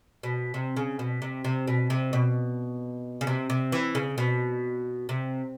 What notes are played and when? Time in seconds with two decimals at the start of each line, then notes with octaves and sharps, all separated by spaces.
0.23 B2
0.54 C3
0.77 C#3
0.99 B2
1.22 C3
1.44 C3
1.67 B2
1.90 C3
2.13 B2
3.21 C#3
3.27 C3
3.50 C3
3.72 E3
3.95 C#3
4.18 B2
5.09 C3